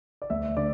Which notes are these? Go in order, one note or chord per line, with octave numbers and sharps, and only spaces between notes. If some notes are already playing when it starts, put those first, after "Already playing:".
D5
D2 E5
D3 A3 D5